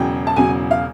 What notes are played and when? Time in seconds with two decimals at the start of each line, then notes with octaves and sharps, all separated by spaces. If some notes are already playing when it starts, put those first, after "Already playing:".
Already playing: E1 E2 C#3 F#3 G5
0.27 A5
0.36 E1 E2 C#3 F#3 G#5
0.71 F5